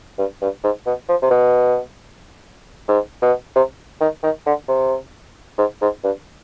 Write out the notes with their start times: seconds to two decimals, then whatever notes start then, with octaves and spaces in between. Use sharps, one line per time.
0.18 G2
0.42 G2
0.64 G#2
0.86 B2
1.09 F3
1.22 C3
1.30 B2
2.88 G#2
3.22 B2
3.56 C3
4.01 D#3
4.23 D#3
4.46 D3
4.68 C3
5.58 G#2
5.81 G#2
6.04 G2